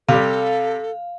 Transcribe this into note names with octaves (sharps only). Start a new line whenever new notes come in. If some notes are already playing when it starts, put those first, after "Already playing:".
C3 G3 A4 F5